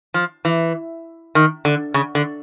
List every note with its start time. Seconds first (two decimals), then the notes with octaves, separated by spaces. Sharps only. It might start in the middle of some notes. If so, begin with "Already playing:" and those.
0.14 F3
0.45 E3
1.35 D#3
1.65 D3
1.94 C#3
2.15 D3